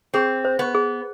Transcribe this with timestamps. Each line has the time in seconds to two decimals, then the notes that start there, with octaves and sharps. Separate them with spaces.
0.14 C4 G#4
0.45 C5
0.59 B3
0.75 G#4